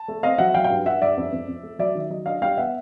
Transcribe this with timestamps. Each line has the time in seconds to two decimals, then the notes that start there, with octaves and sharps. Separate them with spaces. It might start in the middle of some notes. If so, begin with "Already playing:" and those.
Already playing: A5
0.08 A3
0.23 C4 D#5 F5
0.38 F#3 E5 F#5
0.54 F#3 F5 G5
0.64 F5 G5
0.70 G2
0.86 G2 E5 F#5
1.02 G2 D5 E5
1.17 F2
1.32 F2
1.48 F2
1.63 A3
1.79 F#3 D5 E5
1.95 D#3
2.10 F#3 D#5
2.26 D4 D#5 F5
2.42 G3 F5 G5
2.57 B3 E5 F#5